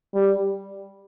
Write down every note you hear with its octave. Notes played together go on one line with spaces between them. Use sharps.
G3